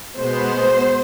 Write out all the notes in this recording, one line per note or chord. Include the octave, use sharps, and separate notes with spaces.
B2 G#3 B3 C5